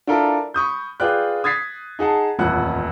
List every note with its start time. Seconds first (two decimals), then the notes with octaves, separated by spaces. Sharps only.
0.07 D4 E4 F4 A4 A#4
0.54 B5 C#6 D#6 G6
1.00 F4 G#4 B4 D5 G5 F#6
1.44 D#6 G#6 A6 B6 C7
1.99 D#4 G#4 F#5 A5
2.39 D#1 A1 F2 F#5 F#6